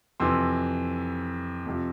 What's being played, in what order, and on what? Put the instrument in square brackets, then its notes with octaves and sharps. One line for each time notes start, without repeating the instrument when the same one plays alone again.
[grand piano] F2 C3 E3 C6 E6
F2 C3 F3